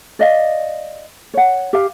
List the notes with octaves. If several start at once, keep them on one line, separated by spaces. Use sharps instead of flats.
D5 D#5 F5
C#5 F#5
G4 F5